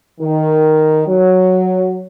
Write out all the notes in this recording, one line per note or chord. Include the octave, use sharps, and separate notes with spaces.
D#3
F#3